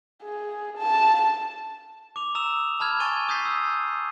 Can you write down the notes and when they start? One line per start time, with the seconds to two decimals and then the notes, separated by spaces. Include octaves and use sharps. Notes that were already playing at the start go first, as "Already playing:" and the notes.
0.23 G#4
0.78 A5
2.16 D6 F7
2.35 A#5 D#6 E6 E7 F7
2.80 A5 B5 F6 G#6
3.00 G#5 C#6 G#6 A6 D#7 G7
3.29 D#6 G6 A6 B6 C7
3.45 E6